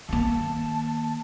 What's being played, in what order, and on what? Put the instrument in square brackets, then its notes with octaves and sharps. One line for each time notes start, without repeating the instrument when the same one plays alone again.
[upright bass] D#3 A#3 [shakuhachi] A5